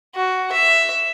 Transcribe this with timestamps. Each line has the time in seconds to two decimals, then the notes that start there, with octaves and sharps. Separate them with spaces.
0.15 F#4
0.52 E5